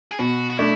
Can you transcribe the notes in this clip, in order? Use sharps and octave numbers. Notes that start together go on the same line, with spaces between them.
G#4
B2 F#4
F#4
A3 D4 E4